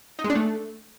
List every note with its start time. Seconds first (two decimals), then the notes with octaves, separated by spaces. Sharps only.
0.19 D#4
0.24 G#3
0.30 D4
0.35 A3